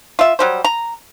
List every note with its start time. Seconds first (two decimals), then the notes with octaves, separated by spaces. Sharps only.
0.19 F4 E5
0.39 F#3 G3 C5
0.64 A#5